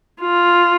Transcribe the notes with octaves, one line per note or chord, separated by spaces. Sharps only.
F4